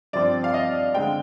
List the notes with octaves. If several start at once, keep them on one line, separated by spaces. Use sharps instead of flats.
G2 F3 C4 D5
F5
D#5
D3 G#3 C4 G5